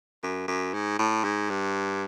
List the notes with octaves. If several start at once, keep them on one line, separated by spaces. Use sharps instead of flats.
F#2
F#2
G#2
A2
G#2
G2